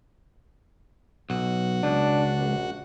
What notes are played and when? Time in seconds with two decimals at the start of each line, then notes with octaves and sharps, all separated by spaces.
1.30 B1 F#4
1.83 C#2 D4
2.39 A#1